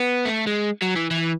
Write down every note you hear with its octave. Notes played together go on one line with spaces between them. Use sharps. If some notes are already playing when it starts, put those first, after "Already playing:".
Already playing: B3
A3
G#3
F#3
E3
E3